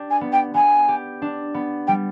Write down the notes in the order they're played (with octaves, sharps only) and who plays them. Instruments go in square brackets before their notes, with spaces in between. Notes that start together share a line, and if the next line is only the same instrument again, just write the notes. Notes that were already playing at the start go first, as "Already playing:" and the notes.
Already playing: [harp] D4 G4
[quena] G#5
[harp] B3
[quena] G5
[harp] B3 [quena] G#5
[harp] G4
D4
B3
[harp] G3 [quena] G5